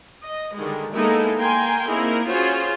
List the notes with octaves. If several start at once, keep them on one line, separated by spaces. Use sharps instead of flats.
D#5
D3 D#3 G3 G#3
G#3 A#3 B3 D#4 E4 A4
A#3 A#4 G5 G#5 C6
A#3 C4 D#4 E4 G#4 A#4
C#4 F4 F#4 G#4 C5 C#5